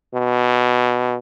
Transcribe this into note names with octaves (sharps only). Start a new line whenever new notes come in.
B2